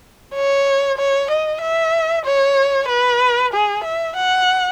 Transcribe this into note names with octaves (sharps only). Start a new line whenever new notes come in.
C#5
C#5
D#5
E5
C#5
B4
G#4
E5
F#5